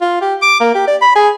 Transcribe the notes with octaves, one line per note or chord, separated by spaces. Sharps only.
F4
G4
D6
A#3
G4
D5
B5
G#4